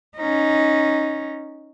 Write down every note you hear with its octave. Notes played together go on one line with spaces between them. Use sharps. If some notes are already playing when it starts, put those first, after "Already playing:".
C#4 D#4